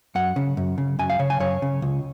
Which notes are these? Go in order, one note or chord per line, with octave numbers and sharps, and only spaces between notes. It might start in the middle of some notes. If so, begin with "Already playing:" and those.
F#2 F#5
C#3
F#2
C#3
F#2 G#5
F5
C#3 C#5
G#5
F#2 C#5
C#3
C#2